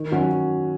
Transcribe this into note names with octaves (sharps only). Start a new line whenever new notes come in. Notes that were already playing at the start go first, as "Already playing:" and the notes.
Already playing: D#3
F#3 C#4 F#4